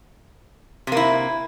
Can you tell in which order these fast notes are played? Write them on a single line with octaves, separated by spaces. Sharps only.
C3 A#3 E4